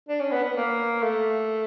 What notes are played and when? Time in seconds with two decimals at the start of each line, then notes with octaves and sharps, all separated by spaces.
0.09 D4
0.20 C#4
0.32 B3
0.44 B3
0.56 A#3
1.03 A3